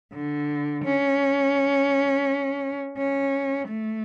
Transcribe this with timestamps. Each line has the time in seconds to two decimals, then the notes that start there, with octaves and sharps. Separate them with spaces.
0.13 D3
0.84 C#4
2.98 C#4
3.68 A3